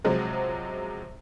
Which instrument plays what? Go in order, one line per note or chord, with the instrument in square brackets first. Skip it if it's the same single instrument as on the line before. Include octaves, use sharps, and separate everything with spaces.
[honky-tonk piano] C3 F3 F#3 G#3